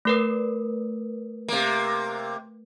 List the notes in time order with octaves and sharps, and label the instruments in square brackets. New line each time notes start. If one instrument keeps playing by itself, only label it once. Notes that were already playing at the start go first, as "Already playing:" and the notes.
[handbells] A3 A#4 B4
[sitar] C3 A#3